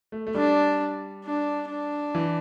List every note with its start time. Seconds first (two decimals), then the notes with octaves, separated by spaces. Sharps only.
0.12 A3
0.27 A3
0.35 G3 D4
1.25 D4
1.69 D4
2.15 E3